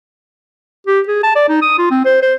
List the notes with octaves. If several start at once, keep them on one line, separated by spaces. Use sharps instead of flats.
G4
G#4
A5
D5
D#4
D#6
F4
C4
C5
C5